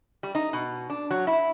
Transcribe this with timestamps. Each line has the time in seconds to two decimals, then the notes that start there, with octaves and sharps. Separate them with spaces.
0.23 G3
0.35 D#4
0.53 B2
0.90 D4
1.11 F#3
1.27 E4